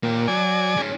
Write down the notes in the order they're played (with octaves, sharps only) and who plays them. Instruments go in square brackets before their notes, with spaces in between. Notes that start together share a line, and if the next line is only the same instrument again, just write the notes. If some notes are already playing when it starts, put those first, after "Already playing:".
[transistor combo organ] A#2 [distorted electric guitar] A#3 G5
[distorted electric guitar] F#3 [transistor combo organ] D5 G#5
[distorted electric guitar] G#2 C#4